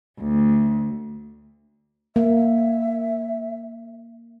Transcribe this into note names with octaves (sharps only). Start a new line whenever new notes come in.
D2
A#3 E5